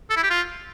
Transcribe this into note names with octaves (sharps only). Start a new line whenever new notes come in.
A4
E4
G4
F4